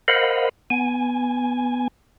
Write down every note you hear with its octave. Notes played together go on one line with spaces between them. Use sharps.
A#4 C5 D#5 F5 F#5 B5
B3 G#5